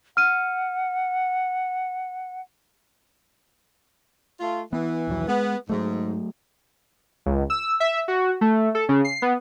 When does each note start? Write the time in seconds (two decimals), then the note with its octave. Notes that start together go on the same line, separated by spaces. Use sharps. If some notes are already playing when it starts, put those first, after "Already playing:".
0.17 F#5 F6 D#7
4.40 A3 F4
4.73 E3 B3
5.08 A#1 D#2 F#3
5.28 G#3 B3
5.70 G#2 F#3 A3
7.26 C#2
7.50 E6
7.80 E5
8.08 F#4
8.41 A3
8.75 A4
8.89 C#3
9.05 C7
9.22 B3